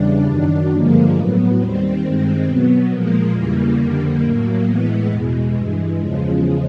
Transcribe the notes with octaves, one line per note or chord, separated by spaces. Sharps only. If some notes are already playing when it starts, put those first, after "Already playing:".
Already playing: E2 C#3 E3 G3 D4
F#2 D#3 F#3
G2 D3 F3 G#3 A#3
A2 F#3 B3
D#2 D#3 G3 C4
G2 D#3 G#3
B2 F#3 B3
A#2 F3 G#3 A#3
E2 C#3 E3 G3 A#3
F2 D3 G3
A2 F#3
A2 E3 G#3 B3
E2 B2 G#3
G2 E3 G#3
E2 C#3 F3 G#3